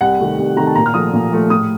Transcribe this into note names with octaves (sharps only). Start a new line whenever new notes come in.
C2 F#5
C3 D#3 A3
C2
C3 D#3 A3 A#5
A5
A#2 A#5
F6
F3 A3 D#6
A#2
F3 A3
A2 D#6